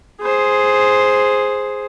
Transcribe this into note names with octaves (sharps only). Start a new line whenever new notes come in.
G#4 C5